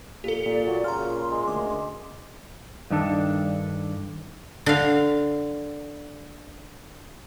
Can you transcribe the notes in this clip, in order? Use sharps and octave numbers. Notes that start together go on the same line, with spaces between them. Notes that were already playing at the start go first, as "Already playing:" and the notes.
A#2 G4 A4
A#2 D5
F#3
A#2 C#3 C#4 A#4 A#5 C6 F6
G#3
D2 D6
G2 D#3 D4 A4
D3 F5